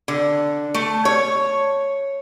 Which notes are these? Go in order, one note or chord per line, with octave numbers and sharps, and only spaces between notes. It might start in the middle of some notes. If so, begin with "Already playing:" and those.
D3
A3
C#5